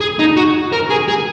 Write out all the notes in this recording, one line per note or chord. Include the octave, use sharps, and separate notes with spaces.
G#4
D#4
F#4
A#4
G#4
G#4